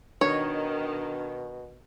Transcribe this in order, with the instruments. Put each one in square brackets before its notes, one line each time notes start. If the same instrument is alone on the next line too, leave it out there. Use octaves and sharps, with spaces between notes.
[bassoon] B2 [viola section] D#3 [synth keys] D4 [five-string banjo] C#5